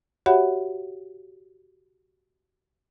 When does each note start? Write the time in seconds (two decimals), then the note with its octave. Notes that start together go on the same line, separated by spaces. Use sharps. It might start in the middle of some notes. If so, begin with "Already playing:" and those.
0.26 F#4 G4 C#5 E5 F#5 B5